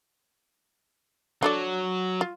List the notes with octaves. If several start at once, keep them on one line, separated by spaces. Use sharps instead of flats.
F#3 D4 A4 D5
F4